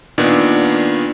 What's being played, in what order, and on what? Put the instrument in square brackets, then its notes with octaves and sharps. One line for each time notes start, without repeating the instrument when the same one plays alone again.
[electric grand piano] A#2 D#3 B3 D4